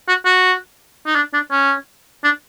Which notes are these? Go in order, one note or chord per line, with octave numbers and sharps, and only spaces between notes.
F#4
F#4
D#4
D4
D4
C#4
D4